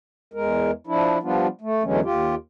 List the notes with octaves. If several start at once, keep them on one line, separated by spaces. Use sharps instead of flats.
E2 G#3 A#4
F3 D4 E4
F3 G3 B3 D4 F4
A3
E2 D3 E3 F#3 G#3 C#4
D#2 F4 G4